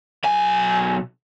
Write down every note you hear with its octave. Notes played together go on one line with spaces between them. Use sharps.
B1 G#5